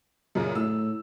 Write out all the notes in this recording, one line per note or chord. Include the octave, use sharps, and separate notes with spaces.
F#2 A#2 C#3
A2 E6